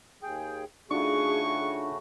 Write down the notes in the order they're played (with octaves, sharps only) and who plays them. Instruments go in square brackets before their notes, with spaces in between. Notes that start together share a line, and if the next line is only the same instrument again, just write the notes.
[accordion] D#2 G#4 G5
[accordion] C#3 A3 F#4 [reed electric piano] D4 D#4 F4 [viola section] G#4 [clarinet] C#6